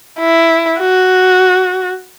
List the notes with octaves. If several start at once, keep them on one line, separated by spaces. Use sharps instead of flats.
E4
F#4